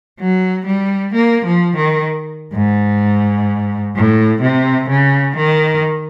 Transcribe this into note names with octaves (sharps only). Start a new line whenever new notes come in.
F#3
G3
A#3
F3
D#3
G#2
A2
C3
C#3
D#3